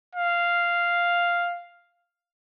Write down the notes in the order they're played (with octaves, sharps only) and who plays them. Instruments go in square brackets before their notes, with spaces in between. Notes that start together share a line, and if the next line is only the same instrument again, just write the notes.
[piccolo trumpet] F5